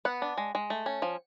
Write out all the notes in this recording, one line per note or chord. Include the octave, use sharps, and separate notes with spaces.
B3 F#5
D4
G#3
G#3
A3
C#4
F3